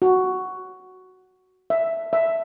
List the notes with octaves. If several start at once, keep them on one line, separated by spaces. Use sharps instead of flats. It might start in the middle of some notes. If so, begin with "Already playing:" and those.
F#4
E5
E5